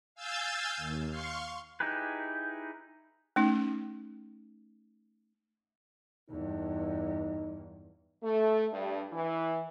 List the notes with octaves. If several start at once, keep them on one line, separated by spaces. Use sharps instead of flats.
F5 G#5 E6 G6 A6
D#2
F5 C6 C#6
D#4 E4 G4 G#4 B4
A3 C#4 D#4
E2 G2 D#4
A3
G2
E3